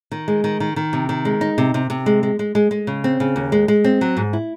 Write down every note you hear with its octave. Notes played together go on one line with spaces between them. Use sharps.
D#3
G#3
D#3
D#3
D#3
C3
D#3
G#3
D#4
C3
C3
C3
G#3
G#3
G#3
G#3
G#3
C#3
C4
C#3
D#2
G#3
G#3
C4
F#3
G#2
E4